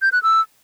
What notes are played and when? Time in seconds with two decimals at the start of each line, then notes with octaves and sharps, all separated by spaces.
0.02 G6
0.12 F#6
0.23 E6